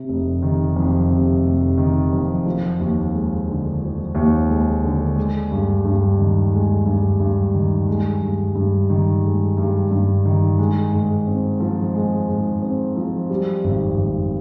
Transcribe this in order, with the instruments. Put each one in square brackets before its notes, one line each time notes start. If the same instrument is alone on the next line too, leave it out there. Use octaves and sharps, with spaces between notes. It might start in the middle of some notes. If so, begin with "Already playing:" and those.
Already playing: [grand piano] C3
F1
D#3
F2
C3
F1
D#3
F2
F3
D#2
G#3
D3
F3
D#2
G#3
D3
G#3
G2
G2
D#3
G#3
G2
G2
D#3
G#3
G2
G2
D#3
G#3
G2
G2
D#3
G#3
G#2
C4
F3
G#3
G#2
C4
F3
G3
G#1
G#1